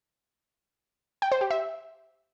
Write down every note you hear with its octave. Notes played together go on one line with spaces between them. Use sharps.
G5
C5
G4
E5